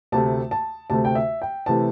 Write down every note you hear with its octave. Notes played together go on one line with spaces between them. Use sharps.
D2 C3 A3 A5
A5
D2 C3 A3 A5
G5
E5
G5
C3 E3 A3 A5